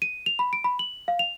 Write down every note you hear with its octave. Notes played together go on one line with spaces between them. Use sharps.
D#7
F7
B5
D7
B5
F#7
F5
F7